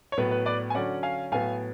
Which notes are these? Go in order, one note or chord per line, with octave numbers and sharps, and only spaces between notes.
C#5
A2 F#3 B3 B4
B4
B4 D5
G#5
D3 F#3 C#4 D5 F#5
F5 G#5
A2 F#3 B3 F5 G#5